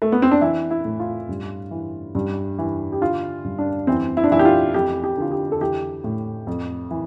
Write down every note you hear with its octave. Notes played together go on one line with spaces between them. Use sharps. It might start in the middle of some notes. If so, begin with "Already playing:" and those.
A3
B3
C4
D4
E3 E4
E4
A2
F4
G2
E3
G2
E3
G4
D3 F4
G2
D4
E3 C4
E4
D4
E3 E4
G4
F4
F2 G4
G4
D3 F4
G4
A4
E3 G4
A2
F2
E3